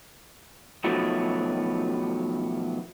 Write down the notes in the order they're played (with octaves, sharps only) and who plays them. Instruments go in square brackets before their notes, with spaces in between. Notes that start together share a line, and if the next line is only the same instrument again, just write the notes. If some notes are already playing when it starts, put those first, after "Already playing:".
[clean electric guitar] B2 D#3 F3 F#3 A3 B3